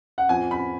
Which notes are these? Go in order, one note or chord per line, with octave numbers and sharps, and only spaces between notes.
F#5
F2 F3 G#5
B5